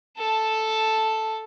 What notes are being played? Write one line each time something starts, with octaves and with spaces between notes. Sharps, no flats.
A4 A5